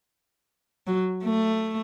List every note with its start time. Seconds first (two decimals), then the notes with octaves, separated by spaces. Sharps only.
0.87 F#3
1.24 A3